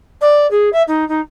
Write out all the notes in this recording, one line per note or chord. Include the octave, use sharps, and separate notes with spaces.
D5
G#4
E5
D#4
D#4